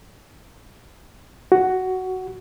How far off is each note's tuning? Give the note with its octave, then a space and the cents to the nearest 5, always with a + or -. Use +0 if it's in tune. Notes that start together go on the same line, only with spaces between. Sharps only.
F#4 +10